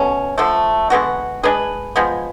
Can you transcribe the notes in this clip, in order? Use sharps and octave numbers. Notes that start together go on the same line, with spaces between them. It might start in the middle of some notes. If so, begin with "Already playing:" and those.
Already playing: B2 F#3 A3 C#4
D3 F3 A3
D3 G#3 B3 F#4
G#3 D4 G#4 B4
F3 G#3 B3